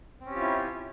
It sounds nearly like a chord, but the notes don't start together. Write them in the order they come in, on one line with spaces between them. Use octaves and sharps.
C4 C#4 G4 F4 E4